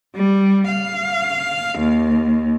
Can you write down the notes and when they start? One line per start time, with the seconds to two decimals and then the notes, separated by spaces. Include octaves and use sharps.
0.15 G3
0.68 F5
1.79 D#2